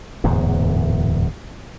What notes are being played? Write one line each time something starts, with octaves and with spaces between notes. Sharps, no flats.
D1 E2 G#2 B2